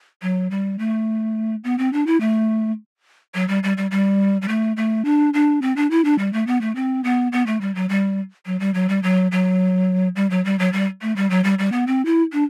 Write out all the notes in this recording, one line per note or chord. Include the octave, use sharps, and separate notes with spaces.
F#3
G3
A3
B3
C4
D4
E4
A3
F#3
G3
G3
G3
G3
G3
A3
A3
D4
D4
C4
D4
E4
D4
G3
A3
B3
A3
C4
B3
B3
A3
G3
F#3
G3
F#3
G3
F#3
G3
F#3
F#3
G3
F#3
G3
F#3
G3
A3
G3
F#3
G3
G3
B3
C4
E4
D4